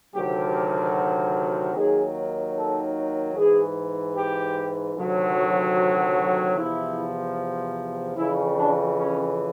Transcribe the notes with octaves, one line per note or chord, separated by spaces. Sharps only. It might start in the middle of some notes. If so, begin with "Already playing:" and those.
D2 C3 D#3 F#3 G4
D#2 D#3 F#3 G#4
A4
G#2 E3 G#4
G4
D2 C3 D#3 F#3
F#4
E2 C3 F3 E4
F2 C#3 E3 E4
D4
C#4